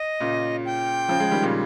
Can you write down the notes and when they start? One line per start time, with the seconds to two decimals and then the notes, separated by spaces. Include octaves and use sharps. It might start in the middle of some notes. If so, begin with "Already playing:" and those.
Already playing: D#5
0.20 A#2 C#3
0.65 G5
1.09 C#3 F3
1.19 F3 G#3
1.31 D#3 G3
1.42 A#2 C#3